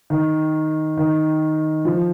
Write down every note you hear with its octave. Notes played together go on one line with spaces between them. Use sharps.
D#3
D#3
F3